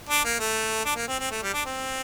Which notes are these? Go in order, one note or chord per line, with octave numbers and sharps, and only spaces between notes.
D4
A#3
A3
D4
A#3
C4
C4
A3
G3
D4
C4